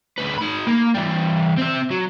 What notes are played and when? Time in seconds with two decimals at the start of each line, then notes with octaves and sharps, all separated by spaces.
0.18 D2 B4
0.38 D#4 B5
0.67 A#3
0.94 E3 G3
1.57 C4 E5
1.91 F#3